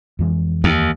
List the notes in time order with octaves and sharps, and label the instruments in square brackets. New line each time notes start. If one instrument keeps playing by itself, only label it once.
[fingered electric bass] F2 E3 G#3
[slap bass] D#2